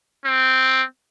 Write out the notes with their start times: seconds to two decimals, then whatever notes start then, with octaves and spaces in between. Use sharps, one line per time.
0.25 C4